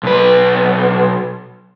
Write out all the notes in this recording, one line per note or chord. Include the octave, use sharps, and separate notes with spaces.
B1 B4